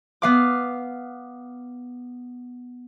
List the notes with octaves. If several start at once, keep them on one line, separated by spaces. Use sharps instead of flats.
B3 F5 D6